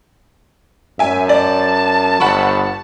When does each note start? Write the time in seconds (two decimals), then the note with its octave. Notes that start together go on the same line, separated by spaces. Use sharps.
0.99 F#2 E5 G#5
1.29 D5 A5
2.20 G1 F#5 B5 C#6